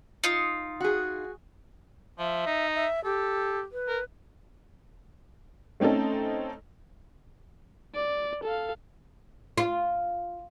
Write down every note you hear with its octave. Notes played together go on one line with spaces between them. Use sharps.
D#4 F4
F#4 G#4
F3 E5
D#4
E5
G4 A4
B4
A#4
A3 C4 C#4 D#4 A4
D5
A4 F5
F4